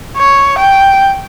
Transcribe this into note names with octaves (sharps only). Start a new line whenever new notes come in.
C#5
G5